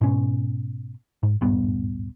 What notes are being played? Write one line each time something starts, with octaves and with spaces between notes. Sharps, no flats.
G#2 B2 C#4
G#2
D#1 G#1 G2 B3